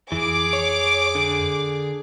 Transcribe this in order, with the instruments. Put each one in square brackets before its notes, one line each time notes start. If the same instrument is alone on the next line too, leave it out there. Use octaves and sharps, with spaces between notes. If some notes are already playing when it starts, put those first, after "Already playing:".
[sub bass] F2 [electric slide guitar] E3 [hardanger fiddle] G#4 [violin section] D6
[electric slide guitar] C#5
D3